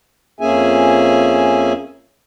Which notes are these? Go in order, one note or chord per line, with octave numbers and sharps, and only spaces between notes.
F2 A#3 C#4 G#4 E5 G#5